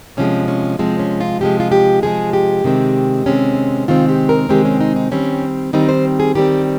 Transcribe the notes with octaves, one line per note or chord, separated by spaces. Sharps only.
C3 F3 G#3 C#4
C#4
C3 F3 G#3 C4
C#4
F4
C3 F3 G#3 G4
F4
G4
C3 F3 G#3 G#4
G4
C3 D#3 G#3 C4
C3 D#3 G#3 C4 C#4
C3 D#3 G#3 C4 F4
G4
A#4
C3 D#3 G#3 C4 G4
C#4
D#4
D#4
D#3 G3 C4 C#4
D#3 G3 C4 D#4
C5
G#4
D#3 G3 C4 G4